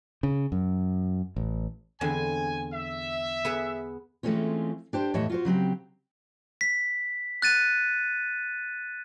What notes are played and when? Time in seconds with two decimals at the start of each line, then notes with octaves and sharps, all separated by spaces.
0.23 C#3
0.52 F#2
1.36 A1
2.01 E2 D3 C4 G#5
2.73 E5
3.45 B3 G#4 B4
4.23 E3 G#3 A3 C4 C#4 F4
4.93 D4 G4 C5
5.14 E2 A2 E3 C#5 D#5 E5
5.30 F4 F#4 C5
5.45 C#3 F#3 C4 G4
6.61 B6
7.42 F#6 A6 D#7